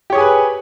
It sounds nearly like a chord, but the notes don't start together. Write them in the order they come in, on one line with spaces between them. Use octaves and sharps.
G4 C#5 G#4 G#5 B4